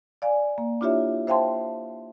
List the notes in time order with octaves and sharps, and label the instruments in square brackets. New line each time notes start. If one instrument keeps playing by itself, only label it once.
[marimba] D5 F5 G#5
A#3
D4 E4 F4 G4 C#5 E5
C5 E5 F5 G5 A5 C6